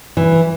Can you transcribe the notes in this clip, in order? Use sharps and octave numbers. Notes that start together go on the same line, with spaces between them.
E3